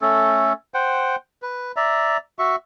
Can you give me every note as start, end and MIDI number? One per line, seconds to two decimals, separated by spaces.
0.02 0.53 57
0.02 0.53 61
0.02 0.53 69
0.74 1.16 72
0.74 1.16 78
0.74 1.16 79
1.42 1.72 71
1.76 2.17 74
1.76 2.17 76
1.76 2.17 82
2.39 2.56 66
2.39 2.56 76
2.39 2.56 85